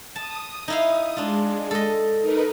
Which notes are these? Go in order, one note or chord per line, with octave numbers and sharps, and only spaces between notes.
A5 D#6
D#4 E4 F5 D#6
G#3 D4 F4
A4 D#5
D#4 A#4 B4